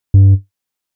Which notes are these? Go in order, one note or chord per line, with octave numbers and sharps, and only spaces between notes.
G2